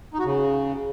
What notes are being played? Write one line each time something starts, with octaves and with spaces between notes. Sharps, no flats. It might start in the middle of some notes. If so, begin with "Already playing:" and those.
D#4
F#4
C#3